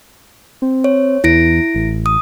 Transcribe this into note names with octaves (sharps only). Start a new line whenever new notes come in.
C4
C#5
E2 E4 A#6 D7
A1
D#6